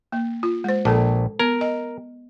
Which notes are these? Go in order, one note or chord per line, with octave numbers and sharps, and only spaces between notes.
A#3
F4
G#3 C5
A#1 A4 A5
B3 A#4
D#5